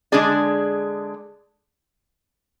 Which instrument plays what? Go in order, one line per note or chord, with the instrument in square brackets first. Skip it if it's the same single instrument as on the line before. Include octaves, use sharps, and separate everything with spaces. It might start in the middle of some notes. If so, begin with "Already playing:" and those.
[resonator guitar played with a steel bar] D3 G#3 D4 G#4 D5